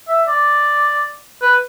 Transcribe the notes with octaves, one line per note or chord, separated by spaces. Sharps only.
E5
D5
B4